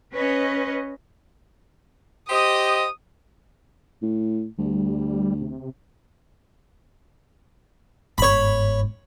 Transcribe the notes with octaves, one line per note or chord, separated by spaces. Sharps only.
C#4 B4 D#5
G4 C5 D#5 D#6
A2
D2 G3
C3
G1 G#2 C#5 B5